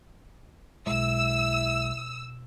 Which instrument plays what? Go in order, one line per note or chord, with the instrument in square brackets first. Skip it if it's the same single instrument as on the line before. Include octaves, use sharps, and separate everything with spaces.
[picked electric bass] B1 G#3 [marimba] B2 [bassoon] E4 [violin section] E6